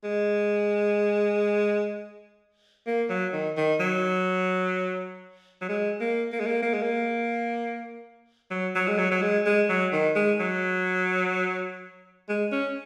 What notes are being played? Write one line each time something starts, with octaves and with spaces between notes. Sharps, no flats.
G#3
A#3
F#3
D#3
D#3
F#3
F#3
G#3
A#3
A#3
G#3
A#3
A#3
G#3
A#3
F#3
F#3
G#3
F#3
F#3
G#3
G#3
F#3
D#3
G#3
F#3
G#3
C#4